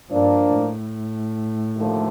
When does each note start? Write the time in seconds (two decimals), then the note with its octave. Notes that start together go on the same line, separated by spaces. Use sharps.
0.10 G2 F3 A#3 D4
0.52 A2
1.76 D#2 D3 F3 A3